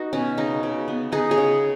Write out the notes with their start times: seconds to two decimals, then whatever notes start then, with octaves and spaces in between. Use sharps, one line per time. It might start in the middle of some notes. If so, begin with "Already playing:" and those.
Already playing: B3 D#4 F#4
0.13 B2 C#4
0.37 C#3 D#4
0.63 C#3
0.88 B3
1.12 B3 D#4 G#4
1.31 G#4 C#5
1.38 C#3